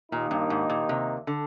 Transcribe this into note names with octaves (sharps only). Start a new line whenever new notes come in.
D#2 A#2 D#3 A#3 D#4
G2
G#2
A#2
C3
D3